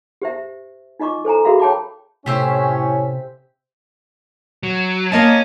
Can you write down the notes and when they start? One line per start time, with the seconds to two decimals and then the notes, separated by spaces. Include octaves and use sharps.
0.22 G4 C5 E5
1.00 D#4 F4 D#5 C#6 D6
1.25 A4 C5 G#5 A#5
1.44 F#4 G#4 A#4 E5 F5 B5
1.60 C#5 G5 A5 B5 D6
2.26 A2 C3 C#4 G4 C5 E5
4.63 F#3
5.12 A#3 C#4 D#5 A5